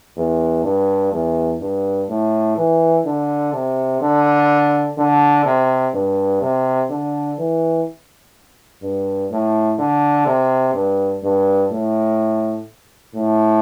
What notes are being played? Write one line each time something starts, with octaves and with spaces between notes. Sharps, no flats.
E2
G2
E2
G2
A2
E3
D3
C3
D3
D3
C3
G2
C3
D3
E3
G2
A2
D3
C3
G2
G2
A2
A2